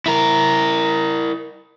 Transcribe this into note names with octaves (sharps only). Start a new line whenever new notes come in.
E4 A#4